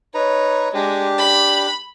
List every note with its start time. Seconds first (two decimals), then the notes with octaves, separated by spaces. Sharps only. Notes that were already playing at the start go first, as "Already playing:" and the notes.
0.14 D#4 B4 C#5 A#5
0.74 G#3 D4 G4
1.18 B5